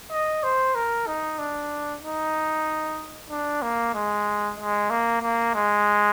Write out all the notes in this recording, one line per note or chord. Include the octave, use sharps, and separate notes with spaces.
D#5
C5
A#4
D#4
D4
D#4
D4
A#3
G#3
G#3
A#3
A#3
G#3